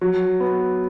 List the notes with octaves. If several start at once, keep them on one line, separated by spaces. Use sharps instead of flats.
F#3
B3